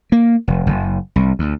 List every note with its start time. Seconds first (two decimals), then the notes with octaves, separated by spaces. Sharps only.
0.12 A#3
0.48 F1
0.67 F#1
1.16 C2
1.39 D2